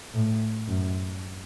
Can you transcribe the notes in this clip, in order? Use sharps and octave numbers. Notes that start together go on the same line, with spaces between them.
A2
F#2